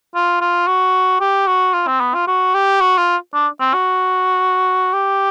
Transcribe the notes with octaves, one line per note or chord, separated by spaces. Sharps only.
F4
F4
F#4
G4
F#4
F4
C4
B3
F4
F#4
G4
F#4
F4
D4
C4
F#4
G4